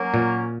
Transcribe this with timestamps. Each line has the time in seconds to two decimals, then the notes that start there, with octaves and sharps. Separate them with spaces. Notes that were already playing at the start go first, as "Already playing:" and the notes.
Already playing: F#3 A#3 C#4
0.14 A#2